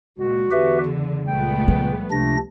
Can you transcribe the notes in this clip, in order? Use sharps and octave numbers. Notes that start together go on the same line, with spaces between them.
C#2 A#2 F#4
E2 D3 G4 B4 E5
C#3
C#2 A#2 G3 A3 B3 G5
F3
C#2 C3 A3 D4 A#6